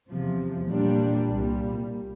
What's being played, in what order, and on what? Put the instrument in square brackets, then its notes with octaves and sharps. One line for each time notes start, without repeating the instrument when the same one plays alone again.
[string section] E2 C3 F3
A#2 G3 D4
C2 A#2 G3